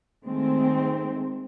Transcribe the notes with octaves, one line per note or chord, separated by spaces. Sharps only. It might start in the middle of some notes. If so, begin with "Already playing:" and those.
D#3 G#3 A3 C4